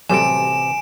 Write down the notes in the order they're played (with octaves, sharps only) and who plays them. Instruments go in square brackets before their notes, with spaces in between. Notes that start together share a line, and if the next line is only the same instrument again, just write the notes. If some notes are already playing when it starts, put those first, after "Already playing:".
[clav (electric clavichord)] A1 C3 [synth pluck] F#3 G3 A4 [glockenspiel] G#5 [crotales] D7 E7